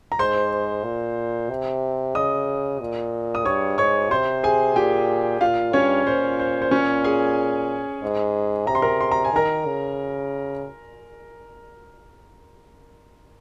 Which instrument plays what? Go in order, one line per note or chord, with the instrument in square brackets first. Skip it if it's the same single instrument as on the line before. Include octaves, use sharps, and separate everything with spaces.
[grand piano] A#5
[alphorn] G#2 [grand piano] C5 C6
[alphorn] A#2
C3
[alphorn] C#3 [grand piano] D#5 D#6
[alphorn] A#2
[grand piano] D#6
[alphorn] G2 [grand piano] C#5 C#6
[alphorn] G#2 [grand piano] C#5 C#6
[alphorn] C3 [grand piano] C5 C6
[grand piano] G#4 G#5
[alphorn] A#2 [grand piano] G4 G5
[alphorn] A#2 [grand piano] F4 F5
[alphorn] G2 [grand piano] C#4 C#5
[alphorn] A#2 [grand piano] C5
[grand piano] C5
C5
C#4 C#5
G#4 G#5
[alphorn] G#2
[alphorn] C3 [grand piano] A#5
[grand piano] C6
A#4 A#5
C6
A#5
G#5
[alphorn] D#3 [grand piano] A#4 A#5
[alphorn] C#3